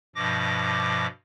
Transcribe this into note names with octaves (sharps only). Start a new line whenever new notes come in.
G2 B2 F3 D6 A#6